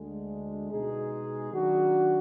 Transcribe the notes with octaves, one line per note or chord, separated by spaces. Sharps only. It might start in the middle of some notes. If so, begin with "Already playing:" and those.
Already playing: D2 D3 G#3
B2 G#3 D#4 G#4
D#3 F#3 D4 F#4